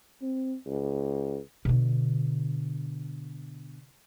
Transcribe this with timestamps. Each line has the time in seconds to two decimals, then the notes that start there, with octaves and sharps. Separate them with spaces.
0.22 C4
0.66 C#2
1.65 B2 D3